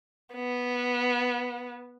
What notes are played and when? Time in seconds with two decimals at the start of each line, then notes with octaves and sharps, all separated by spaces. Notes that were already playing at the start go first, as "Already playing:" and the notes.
0.34 B3